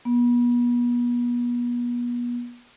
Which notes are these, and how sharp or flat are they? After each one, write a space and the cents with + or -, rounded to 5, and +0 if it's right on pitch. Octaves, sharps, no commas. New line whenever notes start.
B3 -35